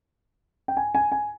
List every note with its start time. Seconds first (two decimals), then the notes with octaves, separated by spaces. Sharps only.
0.68 G5
0.77 G#5
0.95 G#5
1.12 G#5